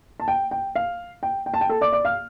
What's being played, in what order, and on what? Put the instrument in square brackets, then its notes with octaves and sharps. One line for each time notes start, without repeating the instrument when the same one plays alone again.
[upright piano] A5
G5
G5
F5
G5
G5
A5
G5
A4 A5
D5 D6
D5 D6
F5 F6